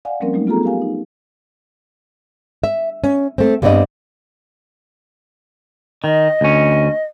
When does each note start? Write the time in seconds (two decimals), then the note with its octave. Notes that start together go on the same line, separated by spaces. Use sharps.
0.05 D5 F5 F#5 G#5
0.20 F3 G3 A#3 C4 C#4 A#4
0.33 F#3 G3 A3 D#4
0.47 B3 F4 F#4 G#4 A4 A#5
0.63 G4 A#4 F5 G#5
0.82 D#4
2.64 E5
3.04 C#4
3.38 A3 C4
3.62 G2 G3 B3 C4 D5 D#5
6.04 D#3 D#5
6.41 D2 C#4